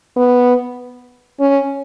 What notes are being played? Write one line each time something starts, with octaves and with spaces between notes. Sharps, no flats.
B3
C#4